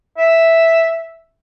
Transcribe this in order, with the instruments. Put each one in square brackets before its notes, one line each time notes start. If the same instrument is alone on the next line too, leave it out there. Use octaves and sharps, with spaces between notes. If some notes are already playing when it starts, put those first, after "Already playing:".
[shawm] E5